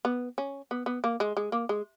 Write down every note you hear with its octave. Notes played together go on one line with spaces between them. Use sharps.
B3
C#4
B3
B3
A#3
G#3
G#3
A#3
G#3